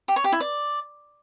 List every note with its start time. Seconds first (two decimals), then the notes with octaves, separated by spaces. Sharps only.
0.08 G4
0.16 C#5
0.24 G4
0.32 E4
0.40 D5